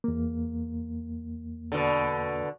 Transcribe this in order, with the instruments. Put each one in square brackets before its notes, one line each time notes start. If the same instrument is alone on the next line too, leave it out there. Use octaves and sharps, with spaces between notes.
[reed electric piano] E2 A#3
[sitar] B2 D3